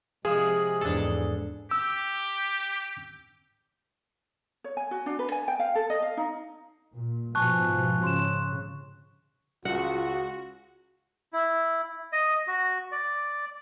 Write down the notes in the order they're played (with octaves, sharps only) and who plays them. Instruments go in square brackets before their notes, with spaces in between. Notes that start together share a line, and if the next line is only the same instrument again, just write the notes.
[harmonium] C3 G#3 [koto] F3 [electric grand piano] G#4
[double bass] E2 G#2 [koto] D4 A4
[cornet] G4 [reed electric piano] E6
[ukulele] C#5
G#5
F#4
D4
B4
G#5
G5
F5
A4
D#5
F5
D#4
[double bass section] A#2
[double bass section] G#2 B2 F3 [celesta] G#5 A5 [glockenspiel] C#6 F#6
[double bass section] C#3 [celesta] C6 E7
[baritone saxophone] C#2 [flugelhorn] F4 [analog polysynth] F#4 [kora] F#5
[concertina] E4
D#5
F#4
D5